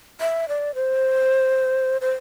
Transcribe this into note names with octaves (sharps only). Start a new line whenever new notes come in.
E5
D5
C5
C5